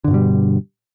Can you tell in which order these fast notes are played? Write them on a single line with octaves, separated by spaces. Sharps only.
D3 G2 B2 G3